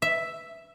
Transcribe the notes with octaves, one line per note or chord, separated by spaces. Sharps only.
E5